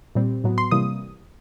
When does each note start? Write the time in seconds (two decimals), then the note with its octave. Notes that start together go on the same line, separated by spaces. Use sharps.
0.15 A#2 G3 C4
0.44 A2 F#3 B3
0.58 C6
0.71 C3 E3 G3 A#3 D#6